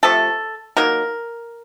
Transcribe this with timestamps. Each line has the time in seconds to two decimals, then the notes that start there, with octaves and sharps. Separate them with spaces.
0.03 C3 F3 A3 A4
0.77 D#3 F#3 A#3 A#4